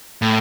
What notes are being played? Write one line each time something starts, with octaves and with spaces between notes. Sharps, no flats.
A2